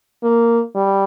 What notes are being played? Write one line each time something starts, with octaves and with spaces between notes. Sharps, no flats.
A#3
G3